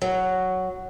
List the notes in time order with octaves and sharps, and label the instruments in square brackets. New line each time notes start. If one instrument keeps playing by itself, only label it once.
[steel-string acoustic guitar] F#3